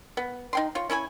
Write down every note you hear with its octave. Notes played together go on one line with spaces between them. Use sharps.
B3
D#4 G5 C6
F4 C#5
C#4 E4 C#5 G#5